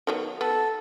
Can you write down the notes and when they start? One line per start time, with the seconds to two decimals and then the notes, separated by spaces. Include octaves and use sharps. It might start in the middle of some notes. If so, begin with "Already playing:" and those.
0.07 D#3 F#3 B3
0.41 B3 A4